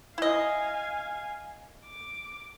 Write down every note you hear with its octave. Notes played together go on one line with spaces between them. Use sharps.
E4 D#5 F5 G#5
D6